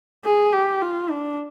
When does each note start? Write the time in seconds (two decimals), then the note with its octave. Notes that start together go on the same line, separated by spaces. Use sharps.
0.25 G#4
0.53 G4
0.82 F4
1.10 D4